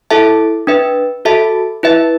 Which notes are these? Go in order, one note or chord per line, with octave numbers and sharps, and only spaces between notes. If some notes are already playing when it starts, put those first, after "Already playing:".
E4 A4 E5 A5
D4 B4 E5
F#4 A4 E5 A5
E4 B4 E5